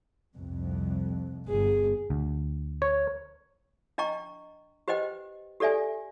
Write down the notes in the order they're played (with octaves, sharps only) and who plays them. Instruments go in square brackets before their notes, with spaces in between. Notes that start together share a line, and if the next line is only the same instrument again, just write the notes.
[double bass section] C2 F2
[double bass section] G1 [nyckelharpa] G#4
[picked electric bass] D2
[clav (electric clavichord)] C#5
[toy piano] D4 D#5 G5 A#5 C#6
G4 B4 C5 D#5 G5
G4 A4 D5 E5 G#5